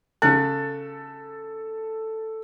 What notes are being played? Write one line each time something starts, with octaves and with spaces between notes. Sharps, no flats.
C#3 A4 F#6